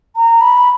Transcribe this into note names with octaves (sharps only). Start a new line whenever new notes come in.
A#5
B5